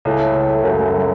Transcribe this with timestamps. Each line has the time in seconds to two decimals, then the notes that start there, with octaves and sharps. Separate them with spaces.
0.05 C#2 A2
0.19 A3
0.34 C#2
0.49 A3
0.63 C#2 F#2
0.79 A3
0.93 F#3